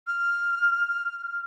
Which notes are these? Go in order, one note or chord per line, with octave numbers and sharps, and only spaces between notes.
F6